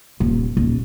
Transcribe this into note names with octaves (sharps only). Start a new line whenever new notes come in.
D#1
D#1